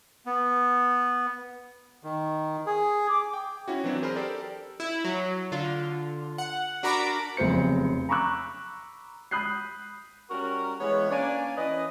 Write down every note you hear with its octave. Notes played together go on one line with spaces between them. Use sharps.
B3
D#3
G#4
D6
G5
C#4 E4 F#4
E3 F#3 C4 D4 E4
G#4 A#4 C5 A#5 B5 F6
G4 A4 A#4 D5
E4
F#3
D3 F4
F#5
D4 F#4 A#4 A#5 B5 D6
F1 B1 C#3 C5 C#7
A#5 B5 C#6 D6 E6 F#6
B5 D#6 F#6 G6 C7
G3 C#4 F#4 A#4
E3 G#3 B3 C#5
A#3 C#4 D4 C#5 D5 G#5
E3 C#4 B4 D#5